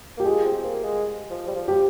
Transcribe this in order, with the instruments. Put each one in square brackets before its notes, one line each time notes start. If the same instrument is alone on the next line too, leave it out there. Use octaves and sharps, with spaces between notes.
[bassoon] A#3 [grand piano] G4
[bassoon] G#3 [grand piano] F4 G#4
[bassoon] C4
A#3
G#3
F3
G3
F3
[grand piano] G4